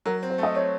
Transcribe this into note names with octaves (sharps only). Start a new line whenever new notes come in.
F#3 A#4
C4
C5
A3 D#5
C4 C#5